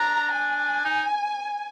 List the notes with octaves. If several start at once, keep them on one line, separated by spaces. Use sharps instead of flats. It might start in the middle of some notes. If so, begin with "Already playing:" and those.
Already playing: D4 A#5
G#5
D#4